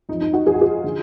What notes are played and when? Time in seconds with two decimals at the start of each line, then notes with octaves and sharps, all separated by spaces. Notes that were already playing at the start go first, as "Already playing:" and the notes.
0.09 F2 D#4
0.13 F3
0.21 D#4
0.33 D#4 F#4
0.46 F2 F3 G#4
0.54 F#4
0.61 F4 G#4
0.84 D3 F3